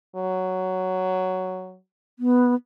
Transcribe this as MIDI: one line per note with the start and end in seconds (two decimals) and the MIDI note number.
0.16 1.77 54
2.19 2.55 59